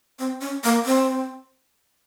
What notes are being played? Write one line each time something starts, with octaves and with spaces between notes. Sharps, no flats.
C4
C#4
A#3
C4